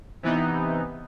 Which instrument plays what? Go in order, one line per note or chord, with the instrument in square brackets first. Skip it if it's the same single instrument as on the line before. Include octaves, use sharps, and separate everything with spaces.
[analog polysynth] C3 E3 B3 D#4